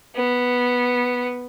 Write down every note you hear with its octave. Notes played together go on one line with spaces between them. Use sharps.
B3